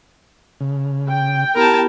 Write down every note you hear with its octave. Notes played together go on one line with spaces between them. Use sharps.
C#3
G5
B3 E4 G4 A#4 A5